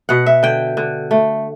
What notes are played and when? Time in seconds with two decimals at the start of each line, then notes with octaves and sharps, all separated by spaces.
0.09 B2 F#5
0.26 E5
0.43 D3 G5
0.77 D3
1.11 A3